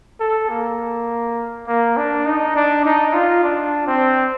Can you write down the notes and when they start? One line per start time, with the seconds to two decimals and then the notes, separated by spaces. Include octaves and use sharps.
0.20 A4
0.50 A#3
1.67 A#3
1.97 D4
2.26 D#4
2.56 D4
2.85 D#4
3.14 F4
3.43 D4
3.87 C4